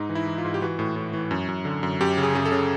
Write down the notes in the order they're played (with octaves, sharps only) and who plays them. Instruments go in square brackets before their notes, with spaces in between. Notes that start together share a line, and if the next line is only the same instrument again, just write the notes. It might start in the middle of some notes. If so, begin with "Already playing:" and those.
Already playing: [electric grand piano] G#2 D#4
E3
E4
E3
F4
G#2
G4
E3 F#4
A2
A2
E3
F#2
F#2
D3
F#2
F#2 G4
C#3
G#4
F#2 G#4
A4
C#3